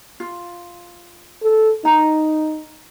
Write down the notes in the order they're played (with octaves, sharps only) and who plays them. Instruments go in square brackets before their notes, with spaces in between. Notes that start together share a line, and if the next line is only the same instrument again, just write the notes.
[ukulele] F4
[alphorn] A4
[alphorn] D#4 [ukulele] A#5